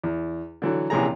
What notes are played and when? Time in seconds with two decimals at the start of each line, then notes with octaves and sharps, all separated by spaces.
0.04 E2
0.62 D3 E3 F#3
0.90 A#1 C3 E3 C#4 G#4 A#5